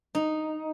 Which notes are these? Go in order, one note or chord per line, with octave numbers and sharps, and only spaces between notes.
D#4